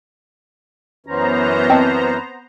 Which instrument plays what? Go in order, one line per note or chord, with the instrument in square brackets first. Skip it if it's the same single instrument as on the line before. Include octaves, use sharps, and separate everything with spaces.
[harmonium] F#2 E3 C#4 [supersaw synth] B3 C5 A#5
[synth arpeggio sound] C4 D#5 A5